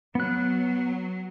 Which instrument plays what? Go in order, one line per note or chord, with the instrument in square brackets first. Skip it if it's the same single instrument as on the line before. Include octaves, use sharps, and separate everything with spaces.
[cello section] F#3 [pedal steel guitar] B3 F#6